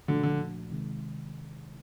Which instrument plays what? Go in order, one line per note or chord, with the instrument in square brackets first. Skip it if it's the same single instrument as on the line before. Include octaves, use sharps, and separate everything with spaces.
[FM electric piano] A#2 F3 A3 D4 F#4 [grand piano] D3
[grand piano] D3
[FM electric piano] C3 D#3 G#3